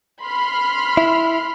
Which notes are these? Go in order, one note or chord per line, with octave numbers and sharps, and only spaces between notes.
B5 C6 F6
E4